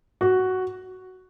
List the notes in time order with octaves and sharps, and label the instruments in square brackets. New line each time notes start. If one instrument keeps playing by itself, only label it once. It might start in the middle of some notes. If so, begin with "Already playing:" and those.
[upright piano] F#4